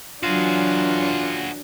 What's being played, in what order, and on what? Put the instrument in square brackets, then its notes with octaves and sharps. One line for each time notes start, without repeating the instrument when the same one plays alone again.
[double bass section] E3 F#3 [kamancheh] D4 [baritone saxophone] F4 [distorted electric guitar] F#4 G#4